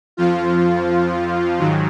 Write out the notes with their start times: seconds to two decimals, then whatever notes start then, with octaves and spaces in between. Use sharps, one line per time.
0.17 F2 F3 F4
1.58 G#2 D#3 F#3